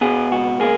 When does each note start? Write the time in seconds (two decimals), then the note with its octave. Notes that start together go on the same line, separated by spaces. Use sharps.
0.01 B2 G#4
0.31 C#2 F#4
0.60 A#3 G#4